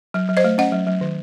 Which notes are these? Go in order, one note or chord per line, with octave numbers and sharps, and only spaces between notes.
F#3
F#3
C5 D#5
A3
C#4 D#5 F#5
F#3
F#3
D#3